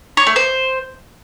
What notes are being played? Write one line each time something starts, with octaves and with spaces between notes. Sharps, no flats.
C#5
A3
C5